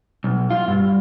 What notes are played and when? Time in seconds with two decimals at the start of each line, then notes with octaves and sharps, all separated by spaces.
0.24 B1
0.51 F4
0.68 G2